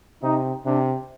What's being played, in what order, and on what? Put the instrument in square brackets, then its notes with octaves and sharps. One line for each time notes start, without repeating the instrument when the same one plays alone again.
[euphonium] C3 [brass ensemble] D#4
[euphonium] C3 [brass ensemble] D4